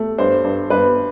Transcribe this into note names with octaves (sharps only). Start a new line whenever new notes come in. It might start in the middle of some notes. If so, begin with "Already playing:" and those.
Already playing: A3
G2 C5
G2
G2 B4